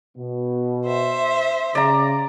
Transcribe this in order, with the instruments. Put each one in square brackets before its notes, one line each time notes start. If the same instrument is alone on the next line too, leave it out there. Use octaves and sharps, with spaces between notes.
[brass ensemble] B2
[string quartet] C5 E5
[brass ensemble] C#3 [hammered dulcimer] D5 A#5